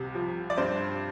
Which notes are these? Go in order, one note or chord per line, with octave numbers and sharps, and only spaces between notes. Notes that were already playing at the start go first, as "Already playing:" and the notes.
Already playing: C2 C3
F3
D5
G2 C5